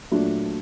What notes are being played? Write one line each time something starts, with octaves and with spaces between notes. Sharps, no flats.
A#2 F#3 A3 D4